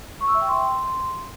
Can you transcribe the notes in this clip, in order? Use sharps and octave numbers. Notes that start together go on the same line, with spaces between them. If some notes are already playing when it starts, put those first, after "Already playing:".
C#6
E6
E5
G5
C6